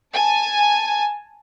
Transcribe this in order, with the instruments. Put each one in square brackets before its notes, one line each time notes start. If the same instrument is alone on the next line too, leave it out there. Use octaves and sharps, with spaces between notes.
[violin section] G#5 A5